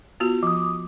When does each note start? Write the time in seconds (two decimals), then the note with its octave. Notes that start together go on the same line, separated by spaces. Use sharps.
0.20 B3 F4 F#4
0.43 F3 D6 D#6